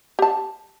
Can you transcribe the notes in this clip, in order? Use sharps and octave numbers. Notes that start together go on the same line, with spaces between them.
G4 A5